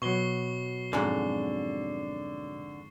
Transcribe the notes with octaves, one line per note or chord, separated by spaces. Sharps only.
B2 F#3 C#6 C7 G7
F2 G#2 D3